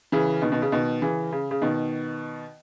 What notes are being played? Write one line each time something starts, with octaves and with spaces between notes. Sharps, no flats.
C#3 E3
B2 D#3
B2 D#3
C#3
B2 D#3
C#3 E3
C#3
C#3
B2 D#3